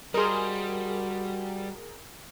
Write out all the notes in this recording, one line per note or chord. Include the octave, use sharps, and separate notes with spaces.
G3 F#4 G#4 A#4 C5 D#5